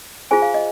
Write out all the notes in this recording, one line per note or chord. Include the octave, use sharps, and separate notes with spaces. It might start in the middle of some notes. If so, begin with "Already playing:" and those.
F4 G#4 C5 G#5
F5
D#5